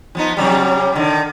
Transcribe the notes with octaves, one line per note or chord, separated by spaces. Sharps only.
F3 B3 D#4
C3 F#3 G3
D3 D#3